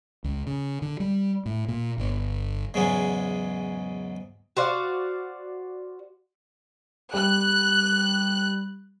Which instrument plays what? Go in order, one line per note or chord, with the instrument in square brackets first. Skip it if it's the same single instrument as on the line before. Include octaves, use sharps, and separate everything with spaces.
[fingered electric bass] C#2
C#3
D3
G3
A2
A#2
G1
[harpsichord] E2 G#2 C#3 F#3 G#3
[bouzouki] F#4 C5 D5 F5
[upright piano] G3 [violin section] F#6